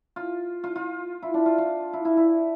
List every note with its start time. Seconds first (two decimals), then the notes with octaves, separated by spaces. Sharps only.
0.16 F4
0.64 F4
0.76 F4
1.22 E4
1.34 D4
1.46 F4
1.58 F4
1.93 E4
2.05 E4
2.17 E4